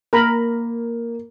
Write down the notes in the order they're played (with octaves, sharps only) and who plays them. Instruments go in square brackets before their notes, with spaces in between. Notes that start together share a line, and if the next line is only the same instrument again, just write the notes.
[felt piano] A#3 [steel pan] A#4 A#5 B5